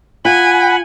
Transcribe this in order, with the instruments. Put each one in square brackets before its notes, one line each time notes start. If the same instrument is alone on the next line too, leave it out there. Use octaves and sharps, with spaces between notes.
[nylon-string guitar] F4 [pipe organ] F#5 B5 [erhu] G#5